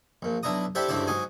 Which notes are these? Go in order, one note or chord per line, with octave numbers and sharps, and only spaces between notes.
A#1 A#2
B1 D4 E4 A#5 D#6
D4 E4 G4 A4 C5 E5
C#2 G2 D3 C4 E4 D5
G#2 F#3 D#5 G#5